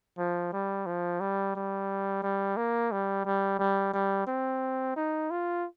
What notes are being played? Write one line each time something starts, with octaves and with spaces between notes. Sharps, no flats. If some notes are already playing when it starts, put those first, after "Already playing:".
F3
G3
F3
G3
G3
G3
A#3
G3
G3
G3
G3
C4
D#4
F4